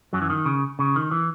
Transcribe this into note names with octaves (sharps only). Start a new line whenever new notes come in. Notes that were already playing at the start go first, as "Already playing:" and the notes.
F#2 F#3
E3
D#3
C#3
C#3
D#3
E3